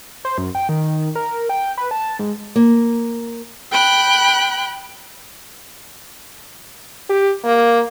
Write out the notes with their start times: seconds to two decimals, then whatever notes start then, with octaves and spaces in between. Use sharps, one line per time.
0.25 C5
0.38 F#2
0.55 G5
0.69 D#3
1.15 A#4
1.49 G5
1.78 B4
1.91 A5
2.19 G#2
2.56 A#3
3.71 G5 B5 F#6
7.09 G4
7.44 A#3